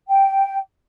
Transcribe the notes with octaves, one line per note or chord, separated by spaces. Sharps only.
G5